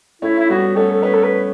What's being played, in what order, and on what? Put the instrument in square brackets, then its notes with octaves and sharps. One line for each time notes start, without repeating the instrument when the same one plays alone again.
[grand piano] A3 C#4 [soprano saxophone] E4
[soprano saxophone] E4
[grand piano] G3 B3 [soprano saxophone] F#4
[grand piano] A3 C#4 [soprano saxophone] A4
[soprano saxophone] A4
[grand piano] A3 C#4 [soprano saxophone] B4
[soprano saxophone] A4
B4